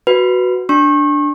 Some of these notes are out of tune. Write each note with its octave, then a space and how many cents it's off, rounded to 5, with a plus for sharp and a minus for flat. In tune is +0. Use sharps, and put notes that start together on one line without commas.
F#4 +0 B4 +0
D4 +0 C#6 -35